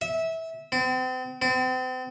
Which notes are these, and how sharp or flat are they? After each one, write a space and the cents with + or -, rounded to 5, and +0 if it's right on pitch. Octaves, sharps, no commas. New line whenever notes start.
E5 -20
C4 -40
C4 -40